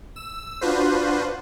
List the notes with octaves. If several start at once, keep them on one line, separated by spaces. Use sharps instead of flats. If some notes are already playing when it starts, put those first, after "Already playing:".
E6
D4 F4 F#4 B4 C5